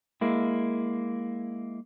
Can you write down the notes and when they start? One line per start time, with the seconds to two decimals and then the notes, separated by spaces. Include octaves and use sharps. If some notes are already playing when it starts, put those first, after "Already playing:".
0.21 G#3 A#3 E4